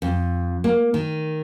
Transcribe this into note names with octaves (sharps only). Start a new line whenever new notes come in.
F2
A#3
D#3